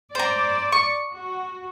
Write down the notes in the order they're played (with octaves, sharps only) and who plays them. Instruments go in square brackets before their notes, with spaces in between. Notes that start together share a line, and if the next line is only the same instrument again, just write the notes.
[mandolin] C5 A#5 [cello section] D5
[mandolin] C#6
[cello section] F#4